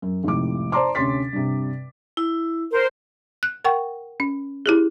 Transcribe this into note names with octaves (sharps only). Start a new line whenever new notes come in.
F#2
G#1 F2 A2 C3 D6
C5 D5 A5 A#5 C6 D6
D2 C3 C#4 C6 A6 B6
G2 C3
E4
A#4 C5
F#6
A#4 F#5 G5 C#6
C#4
E4 G4 G#4